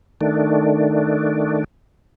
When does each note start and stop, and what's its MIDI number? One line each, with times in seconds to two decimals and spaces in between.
0.21 1.64 51
0.21 1.64 57
0.21 1.64 62